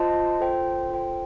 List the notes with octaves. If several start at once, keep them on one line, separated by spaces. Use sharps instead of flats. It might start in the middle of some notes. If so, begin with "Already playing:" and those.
Already playing: F4 C5 D#5 A5
F4 A4 C5 G5
F4 A4 C5 G5